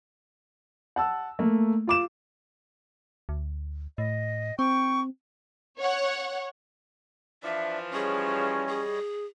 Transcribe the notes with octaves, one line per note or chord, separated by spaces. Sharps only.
F#5 A5 E6
A3 A#3
F4 D6 E7
D2
A2 D#5
C4 G5 C#6
C#5 F#5
E3 F3 D4 D5 E5
G3 C#4 G#4 C#5 D#5
G#4